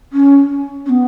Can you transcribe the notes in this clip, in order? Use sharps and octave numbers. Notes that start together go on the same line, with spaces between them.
C#4
C#4
B3